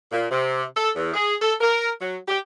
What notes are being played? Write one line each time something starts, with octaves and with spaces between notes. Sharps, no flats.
A#2
C3
A4
E2
G#4
A4
A#4
F#3
G4